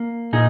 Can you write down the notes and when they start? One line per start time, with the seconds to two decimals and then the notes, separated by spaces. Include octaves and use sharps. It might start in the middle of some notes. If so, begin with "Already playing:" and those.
Already playing: A#3
0.33 A#2 D#4 G#4